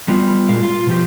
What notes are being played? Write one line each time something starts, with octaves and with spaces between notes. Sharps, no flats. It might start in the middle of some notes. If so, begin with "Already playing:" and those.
G3 B3 F4
A#2 G#3 A#4 F5
F4
B2 F3 G4